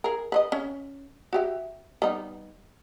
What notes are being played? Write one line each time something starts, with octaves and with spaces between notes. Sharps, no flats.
G#4 A#4
B4 C5 D#5
C#4
F#4 G4 E5
G3 B3 D#4